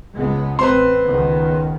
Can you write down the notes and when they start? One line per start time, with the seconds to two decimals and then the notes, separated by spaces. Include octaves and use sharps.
0.13 C#2 G#3 B3
0.59 A1 C4 B4 C5 C6
1.04 C#2 D#3 B3